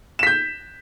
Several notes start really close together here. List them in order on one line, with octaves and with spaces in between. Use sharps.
E7 B6 G6